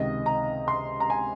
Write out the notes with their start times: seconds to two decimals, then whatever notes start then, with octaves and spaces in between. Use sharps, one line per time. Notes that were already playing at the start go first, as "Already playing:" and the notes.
Already playing: C#2 C3 D#3 D#5
0.26 A#5
0.68 C6
1.00 A#5
1.10 G#5